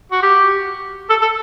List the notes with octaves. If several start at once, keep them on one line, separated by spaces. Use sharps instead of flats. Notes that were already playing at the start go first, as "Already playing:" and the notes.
F#4
G4
A4
A4